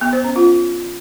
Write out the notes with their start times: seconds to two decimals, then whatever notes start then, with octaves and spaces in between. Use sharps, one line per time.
0.01 B3
0.13 C5
0.24 C#4
0.36 F4